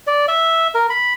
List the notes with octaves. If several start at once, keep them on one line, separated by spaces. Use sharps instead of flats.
D5
E5
A#4
B5